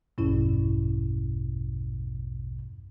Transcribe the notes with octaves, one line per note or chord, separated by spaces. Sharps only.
A#1 E2 G2 B2 C#4 E4